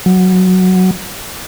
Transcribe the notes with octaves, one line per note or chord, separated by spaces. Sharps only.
F#3